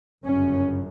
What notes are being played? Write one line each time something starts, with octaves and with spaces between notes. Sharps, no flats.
G1 F#2 C#3 C#4